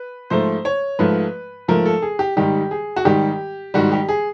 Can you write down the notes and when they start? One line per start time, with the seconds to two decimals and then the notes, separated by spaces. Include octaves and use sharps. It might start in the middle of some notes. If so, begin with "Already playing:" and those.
Already playing: B4
0.30 G#2 F3 A3 C5
0.65 C#5
0.99 G#2 F3 A3 B4
1.68 G#2 F3 A3 A#4
1.85 A4
2.02 G#4
2.19 G4
2.37 G#2 D#3 G3 G4
2.71 G#4
2.96 F#4
3.05 G#2 D#3 G3 G4
3.74 G#2 D#3 G3 F#4
3.92 G4
4.09 G#4